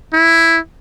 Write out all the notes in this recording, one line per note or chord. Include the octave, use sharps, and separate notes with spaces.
E4